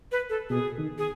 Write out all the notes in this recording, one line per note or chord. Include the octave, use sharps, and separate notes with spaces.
B4
A4
B2 G#4
D#3
G#4